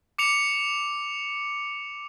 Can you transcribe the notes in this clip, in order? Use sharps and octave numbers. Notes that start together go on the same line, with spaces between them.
D6 C#7 F7